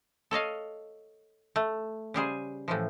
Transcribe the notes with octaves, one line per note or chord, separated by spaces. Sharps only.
A4 C#5 D#5 F5
A3
C#3 G3 G#4 C5
A2 E3 F3